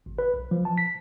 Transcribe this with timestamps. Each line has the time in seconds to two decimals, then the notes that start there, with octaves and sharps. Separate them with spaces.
0.06 G#1
0.19 B4
0.34 B1
0.51 F3
0.65 A5
0.78 B6